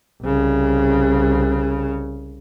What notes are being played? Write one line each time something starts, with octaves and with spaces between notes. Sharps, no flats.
C2 C#3